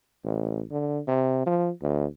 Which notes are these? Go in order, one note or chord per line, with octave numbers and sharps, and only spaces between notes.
A1
D3
C3
F3
D2